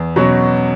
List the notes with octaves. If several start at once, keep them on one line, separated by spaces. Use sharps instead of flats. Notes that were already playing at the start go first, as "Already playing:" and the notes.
Already playing: E2
B2 F#3 C#4